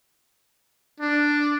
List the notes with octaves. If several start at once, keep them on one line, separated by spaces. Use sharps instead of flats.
D4